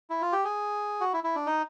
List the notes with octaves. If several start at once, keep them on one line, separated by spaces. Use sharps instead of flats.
E4
F4
G4
G#4
F#4
E4
E4
D4
D#4